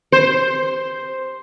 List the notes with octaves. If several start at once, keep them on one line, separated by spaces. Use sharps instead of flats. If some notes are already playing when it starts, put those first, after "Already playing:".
C5